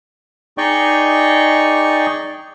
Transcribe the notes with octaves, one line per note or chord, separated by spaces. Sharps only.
D#4 G#4 D5 D#5 G5 C#6